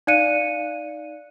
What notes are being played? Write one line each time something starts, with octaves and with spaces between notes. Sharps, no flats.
D#4 D5 F5 F#6 C#7 D#7